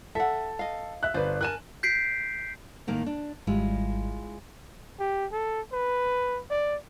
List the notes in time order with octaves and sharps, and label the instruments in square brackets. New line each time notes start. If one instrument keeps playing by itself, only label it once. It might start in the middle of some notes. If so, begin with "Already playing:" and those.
[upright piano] A4 [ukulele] E5 F#5
[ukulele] D#5 F5
[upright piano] E5 F#6
[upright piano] G1 B4 [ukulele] C5 D5
[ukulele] A#4 G#5 A5 [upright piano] F#6 E7
[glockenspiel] G6 B6 C7 D7
[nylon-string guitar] A2 D#3 A#3
D4
[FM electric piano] G#1 G3 [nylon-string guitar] G#3 E4 F4
[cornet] G4
A4
B4
D5